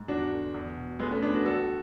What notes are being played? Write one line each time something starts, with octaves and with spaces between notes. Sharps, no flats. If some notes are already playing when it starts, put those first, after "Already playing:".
Already playing: G#2
E2 D4 F#4
D3
E2
B2
D2 G#3 B3
A3 C#4
D3 B3 D4
D4 F#4
C#2 F#4 A4